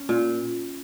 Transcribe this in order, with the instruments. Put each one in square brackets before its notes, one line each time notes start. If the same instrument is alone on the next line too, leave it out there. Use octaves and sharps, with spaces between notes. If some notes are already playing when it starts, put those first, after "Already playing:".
Already playing: [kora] C#4
A#2